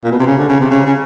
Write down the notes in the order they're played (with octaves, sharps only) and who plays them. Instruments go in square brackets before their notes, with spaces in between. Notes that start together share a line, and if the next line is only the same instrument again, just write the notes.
[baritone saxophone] A#2
B2
C3
C#3
D3
C#3
C3
C#3
C#3